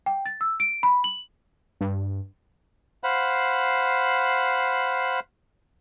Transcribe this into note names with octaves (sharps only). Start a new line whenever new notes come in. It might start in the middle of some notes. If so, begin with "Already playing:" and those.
G5
A6
E6
D7
B5
F#7
G2
C5 F5 F#5 B5